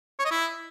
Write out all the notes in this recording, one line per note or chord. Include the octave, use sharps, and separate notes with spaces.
C#5
D#5
E4